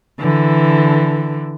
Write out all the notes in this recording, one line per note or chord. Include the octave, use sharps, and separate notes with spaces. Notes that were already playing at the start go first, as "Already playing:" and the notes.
D3 E3